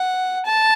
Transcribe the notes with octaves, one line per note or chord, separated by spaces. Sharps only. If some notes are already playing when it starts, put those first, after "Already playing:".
Already playing: F#5
A5